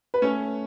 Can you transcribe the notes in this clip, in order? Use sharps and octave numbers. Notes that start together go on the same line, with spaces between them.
B4
A3 C#4 C#5